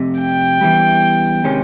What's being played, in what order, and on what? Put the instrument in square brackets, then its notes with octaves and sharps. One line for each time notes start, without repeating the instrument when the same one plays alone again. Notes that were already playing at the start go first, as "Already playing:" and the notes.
Already playing: [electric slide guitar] F2 C3
[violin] G5
[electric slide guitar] E2 C3 E3 G3
C3 D#3 G#3 C#4